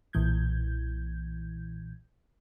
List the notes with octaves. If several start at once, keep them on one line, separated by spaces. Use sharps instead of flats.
B1 A#2 E3 G6 G#6